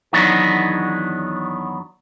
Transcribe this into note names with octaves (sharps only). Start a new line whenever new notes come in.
E2 D#3 F#3 B3 D4